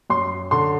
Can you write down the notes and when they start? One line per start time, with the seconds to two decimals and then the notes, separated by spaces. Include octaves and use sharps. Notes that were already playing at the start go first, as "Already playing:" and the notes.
0.10 F#2 C6
0.51 D3 C6